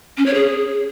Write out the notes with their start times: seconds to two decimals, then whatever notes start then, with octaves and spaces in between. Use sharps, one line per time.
0.17 C#4
0.25 C#5
0.34 G#4